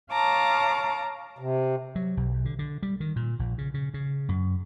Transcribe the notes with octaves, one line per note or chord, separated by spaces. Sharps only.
C#5 F5 A5 A#5 D6
C3
F#3
B1
D3
D3
G3
D#3
A#2
A#1
C#3
C#3
C#3
F#2